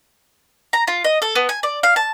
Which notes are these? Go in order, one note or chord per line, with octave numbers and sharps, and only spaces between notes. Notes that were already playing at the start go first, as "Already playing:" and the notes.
A#5
F4
D#5
A4
B3
G#5
D5
F5
A5